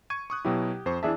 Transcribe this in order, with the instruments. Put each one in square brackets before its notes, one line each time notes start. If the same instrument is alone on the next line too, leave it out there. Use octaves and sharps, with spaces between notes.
[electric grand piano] C#6 G#6 D#7
C#6 D#6 F#6
[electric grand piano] B2 F#3 E4 [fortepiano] G4
[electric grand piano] F2 C5 C#6
[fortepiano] E3 D4 E5 [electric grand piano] G#4 A5